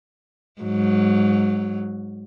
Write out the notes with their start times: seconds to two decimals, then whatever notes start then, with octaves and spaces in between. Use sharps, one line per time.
0.62 G#2 F#3